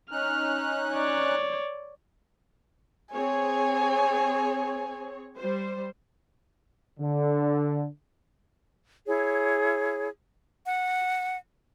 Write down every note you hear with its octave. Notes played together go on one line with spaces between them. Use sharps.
C#4 D#4 F6 F#6
C#5 D5
C4 G#4 C#5 G#5
G3 C5
D3
E4 G#4 C#5
F#5